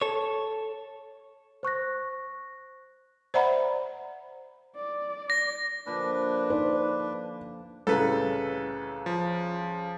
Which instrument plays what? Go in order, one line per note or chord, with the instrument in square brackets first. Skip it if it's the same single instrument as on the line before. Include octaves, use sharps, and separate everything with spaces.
[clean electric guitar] A4 C#5
[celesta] C5 C#6 F#6 A#6
[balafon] C5 D5 E5 F#5 A#5 B5
[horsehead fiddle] D5
[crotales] A#6
[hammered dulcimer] A#2 D3 F3 [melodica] D4 B4
[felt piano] D#4 C5 D5
[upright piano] C2 A2 C#3 [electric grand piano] A4 B4
[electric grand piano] F3